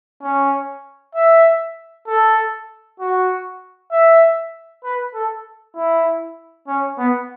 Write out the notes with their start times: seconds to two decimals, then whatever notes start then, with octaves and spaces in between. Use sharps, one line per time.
0.22 C#4
1.15 E5
2.07 A4
3.00 F#4
3.92 E5
4.84 B4
5.14 A4
5.76 E4
6.68 C#4
6.98 B3